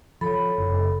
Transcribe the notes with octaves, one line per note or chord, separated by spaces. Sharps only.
F3 A4 C#5 B5
F#1